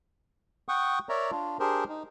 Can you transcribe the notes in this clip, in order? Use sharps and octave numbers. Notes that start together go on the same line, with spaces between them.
F#5 G5 C#6 D#6
A#4 C#5 D5 E5 A#5
D4 F4
D4 G4 G#4 A#4 C5
D#4